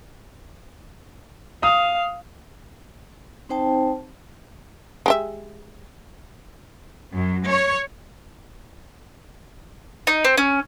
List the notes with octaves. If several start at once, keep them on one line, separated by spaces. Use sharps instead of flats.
F5 D#6
C4 D#4 C5 G5 A5
G#3 G4 E5
F#2
C#5
D#4
C4
C#4